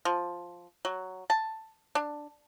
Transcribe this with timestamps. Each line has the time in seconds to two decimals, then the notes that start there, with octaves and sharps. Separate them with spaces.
0.05 F3
0.85 F#3
1.30 A5
1.95 D4